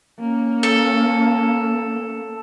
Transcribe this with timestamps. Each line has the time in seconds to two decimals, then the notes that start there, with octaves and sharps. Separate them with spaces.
0.20 A#3 C#4
0.63 A4